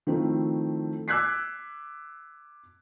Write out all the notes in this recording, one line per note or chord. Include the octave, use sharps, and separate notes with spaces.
D#3 F3 A3 C4 E4
D6 E6 F#6 G#6 B6 C7